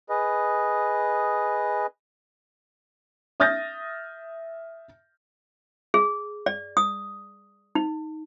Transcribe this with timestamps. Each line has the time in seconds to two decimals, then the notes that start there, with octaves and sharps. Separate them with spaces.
0.10 G#4 B4 D#5
3.40 E5 D#6 F6 G6 A6 A#6
5.94 G#4
6.46 D5
6.77 D#6
7.75 D#4